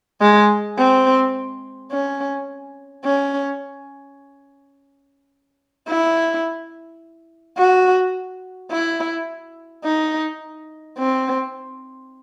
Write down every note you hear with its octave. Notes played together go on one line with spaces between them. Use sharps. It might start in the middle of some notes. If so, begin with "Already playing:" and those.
G#3
C4
C#4
C#4
E4
F#4
E4
D#4
C4